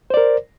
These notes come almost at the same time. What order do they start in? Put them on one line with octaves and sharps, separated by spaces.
C5 D5 A#4